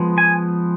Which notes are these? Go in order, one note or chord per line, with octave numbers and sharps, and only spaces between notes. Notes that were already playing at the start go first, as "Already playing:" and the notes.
Already playing: F3 G#3 B3
G#5